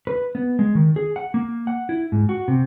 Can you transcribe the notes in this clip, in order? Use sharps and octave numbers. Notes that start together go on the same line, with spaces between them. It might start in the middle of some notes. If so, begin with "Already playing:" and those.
B4
B3
G#3
D#3
G#4
F#5
A#3
F#5
E4
G#2
F#4
C3